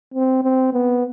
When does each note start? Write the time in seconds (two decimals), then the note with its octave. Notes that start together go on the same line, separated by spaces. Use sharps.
0.14 C4
0.43 C4
0.73 B3